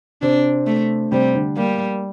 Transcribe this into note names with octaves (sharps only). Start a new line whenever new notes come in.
C3 C4 D4
A3
C3 G3 C4
D3 D4
G3 A#3